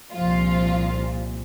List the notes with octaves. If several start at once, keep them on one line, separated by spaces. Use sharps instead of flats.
C2 A#2 F3 F4